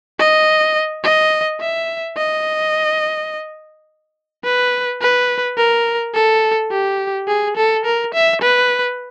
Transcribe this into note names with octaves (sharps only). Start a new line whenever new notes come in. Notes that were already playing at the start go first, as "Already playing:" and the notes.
D#5
D#5
E5
D#5
B4
B4
A#4
A4
G4
G#4
A4
A#4
E5
B4